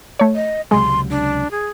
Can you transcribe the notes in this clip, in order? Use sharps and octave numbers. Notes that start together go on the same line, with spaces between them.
A3 C#5
D#5
C#2 C3 F#3 G#3 C6
D4
G#4